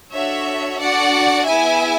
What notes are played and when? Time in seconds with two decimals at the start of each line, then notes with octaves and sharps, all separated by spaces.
0.12 D4 F#4 A4 C#5 E5
0.79 D4 F#4 A4 D5 F#5
1.45 B3 E4 G#4 E5 G#5